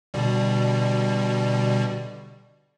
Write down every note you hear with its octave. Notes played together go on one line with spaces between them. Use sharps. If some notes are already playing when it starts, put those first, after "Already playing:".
B2 D3 G3